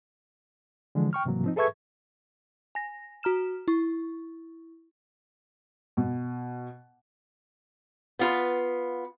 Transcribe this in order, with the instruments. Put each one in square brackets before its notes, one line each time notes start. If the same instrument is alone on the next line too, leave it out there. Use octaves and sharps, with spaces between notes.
[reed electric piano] D3 E3 F3 G#3
G5 C#6 F6
G#2 C3 E3 F#3 A#3
F3 C4 D#4
G#4 A4 B4 E5 C#6 G#6
[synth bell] G#5 A#6
F#4 A#5 F6 E7
E4 C#6
[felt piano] B2
[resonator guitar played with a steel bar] B3 F4 B4